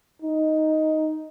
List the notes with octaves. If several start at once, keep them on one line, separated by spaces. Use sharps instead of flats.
D#4